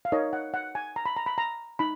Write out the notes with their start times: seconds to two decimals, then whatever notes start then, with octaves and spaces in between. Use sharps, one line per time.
0.05 F5
0.12 D#4 A#4 C#5 D#5
0.33 F#5
0.54 F#5
0.75 G#5
0.96 A#5
1.06 B5
1.17 A#5
1.26 B5
1.38 A#5
1.79 D#4 B5